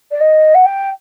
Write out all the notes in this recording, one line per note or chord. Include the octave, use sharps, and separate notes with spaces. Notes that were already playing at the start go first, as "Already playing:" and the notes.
D5
D#5
F#5
G5